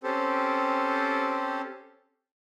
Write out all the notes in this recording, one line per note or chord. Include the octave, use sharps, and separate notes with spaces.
C4 C#4 G4 A4 C5